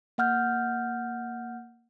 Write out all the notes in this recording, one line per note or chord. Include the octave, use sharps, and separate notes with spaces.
A#3 F#5 F6 G6